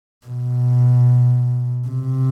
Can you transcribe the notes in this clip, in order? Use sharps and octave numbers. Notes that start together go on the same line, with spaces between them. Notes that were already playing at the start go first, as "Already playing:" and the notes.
B2
C3